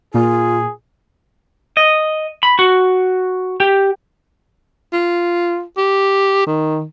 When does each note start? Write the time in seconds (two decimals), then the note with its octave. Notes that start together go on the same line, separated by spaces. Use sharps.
0.14 A#2 F4 G#4
1.77 D#5
2.43 B5
2.59 F#4
3.60 G4
4.93 F4
5.78 G4
6.47 D#3